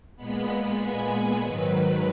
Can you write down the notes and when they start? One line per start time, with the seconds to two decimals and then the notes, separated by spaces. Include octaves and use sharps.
0.16 A#2 G#3 B3 B5
0.79 G#5
1.41 G#2 D#3 F#3 B4